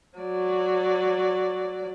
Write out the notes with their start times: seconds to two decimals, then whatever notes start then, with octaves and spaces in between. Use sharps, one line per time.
0.19 F#3 D5